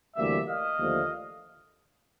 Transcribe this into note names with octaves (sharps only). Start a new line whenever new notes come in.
D2 C3 E3 G3 A#3 D5 E5
D#5 F5
D#2 D3 F3 A3